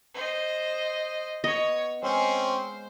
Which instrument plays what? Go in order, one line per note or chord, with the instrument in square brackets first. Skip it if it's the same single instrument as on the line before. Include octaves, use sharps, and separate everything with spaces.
[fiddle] C5 D#5
[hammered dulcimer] B3 [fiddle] C#5 [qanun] D#5
[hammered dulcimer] G#3 [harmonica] C4 C#4 [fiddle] C5